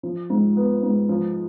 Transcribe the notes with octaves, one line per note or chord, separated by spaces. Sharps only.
F3
G#2
B3
G#2
F3